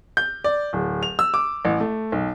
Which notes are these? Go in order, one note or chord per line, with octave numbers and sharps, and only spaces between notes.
G6
D5
D1
F7
E6
D6
A1
A3
B1